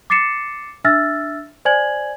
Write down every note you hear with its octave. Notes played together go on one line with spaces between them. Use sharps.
D6 A6 C7 C#7 E7
D4 E5 E6 F6 A6 A#6
C5 D5 G#5 G#6 F#7